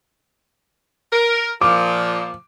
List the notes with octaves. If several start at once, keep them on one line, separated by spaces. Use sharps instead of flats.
A#4
A#2 F3 D6